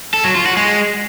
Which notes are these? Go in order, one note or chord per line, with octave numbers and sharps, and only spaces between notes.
A4
F#3
F4
F#4
G#3